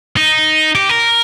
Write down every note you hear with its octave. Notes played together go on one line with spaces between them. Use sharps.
D#4
G4
A#4